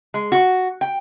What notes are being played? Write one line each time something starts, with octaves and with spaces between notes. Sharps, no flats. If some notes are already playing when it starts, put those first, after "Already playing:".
G#3
F#4
G5